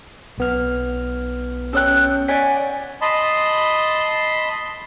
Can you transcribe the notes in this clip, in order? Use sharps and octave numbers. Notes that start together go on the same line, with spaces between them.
B1 B3 F6
C#4 A4 C#5 G5 E6 F#6
C#5 D5 F#5 G#5 B6
D#5 A5 B5 C6